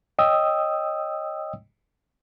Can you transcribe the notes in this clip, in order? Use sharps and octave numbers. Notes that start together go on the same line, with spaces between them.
C#5 D#5 G5 D#6 E6